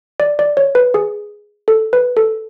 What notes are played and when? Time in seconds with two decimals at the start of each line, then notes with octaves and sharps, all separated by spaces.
0.20 D5
0.39 D5
0.57 C#5
0.75 B4
0.94 G#4
1.68 A4
1.93 B4
2.17 A4